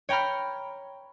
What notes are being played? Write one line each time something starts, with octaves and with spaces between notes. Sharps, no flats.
C#5 G5 A#5 B5 F6